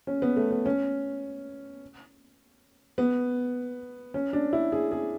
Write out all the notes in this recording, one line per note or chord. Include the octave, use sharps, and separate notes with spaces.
C#4
B3
A3
B3
C#4
B3
C#4
D4
E4
G#4
G#4